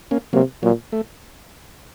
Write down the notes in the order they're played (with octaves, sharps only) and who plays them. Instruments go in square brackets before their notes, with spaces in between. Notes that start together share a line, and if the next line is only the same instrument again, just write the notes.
[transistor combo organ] A#3 C#4
[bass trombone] C3 [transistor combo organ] F#3 A#3
[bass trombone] A#2 [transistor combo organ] F#3
[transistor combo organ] A3